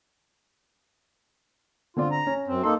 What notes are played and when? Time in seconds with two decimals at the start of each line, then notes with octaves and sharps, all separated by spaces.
1.96 D3 C4 F4 D5
2.11 A#5
2.27 C#4
2.47 F#2 C4
2.63 A#3 D#4 A4 C6